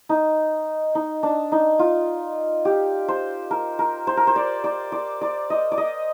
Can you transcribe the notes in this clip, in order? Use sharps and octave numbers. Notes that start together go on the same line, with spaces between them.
D#4
D#4
D4
D#4
F4
G4
C5
A#4
A#4
C5
A#4
C5
D5
D5
D5
D5
D#5
D5
D#5